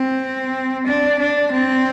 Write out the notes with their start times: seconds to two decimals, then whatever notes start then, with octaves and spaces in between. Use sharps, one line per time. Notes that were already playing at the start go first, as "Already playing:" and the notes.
Already playing: C4
0.87 D4
1.19 D4
1.52 C4